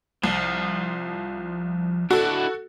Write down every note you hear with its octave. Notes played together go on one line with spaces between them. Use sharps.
C2 F3
D4 E4 F#4 A4